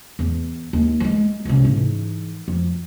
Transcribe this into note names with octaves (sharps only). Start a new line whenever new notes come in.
E2
D#2
F#3 G#3
C#2 C3
G#2 E3
F2